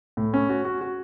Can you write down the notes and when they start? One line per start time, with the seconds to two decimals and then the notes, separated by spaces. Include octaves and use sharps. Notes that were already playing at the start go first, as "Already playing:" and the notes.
0.17 A2
0.34 C#4
0.50 F#4
0.65 F#4
0.81 F#4